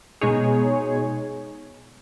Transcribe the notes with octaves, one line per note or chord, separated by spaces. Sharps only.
B2 G#3 D#4 G#4 C#5